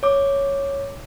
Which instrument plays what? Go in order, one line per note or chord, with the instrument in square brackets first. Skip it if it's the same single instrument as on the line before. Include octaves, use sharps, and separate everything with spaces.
[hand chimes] C#5 D6